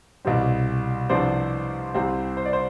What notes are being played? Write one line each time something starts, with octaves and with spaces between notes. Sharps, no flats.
C2 B2 G3 C4
C2 C3 F3 B3 D4 C5
C2 C3 G3 C4
C5
D5
C5